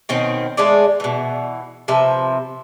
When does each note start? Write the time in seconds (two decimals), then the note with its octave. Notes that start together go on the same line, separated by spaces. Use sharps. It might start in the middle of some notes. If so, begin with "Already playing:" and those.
0.09 B2 D#3 C4 C#4
0.57 G#3 A3 G#4 D5
1.00 B2 E3
1.88 C3 F3 B4 E5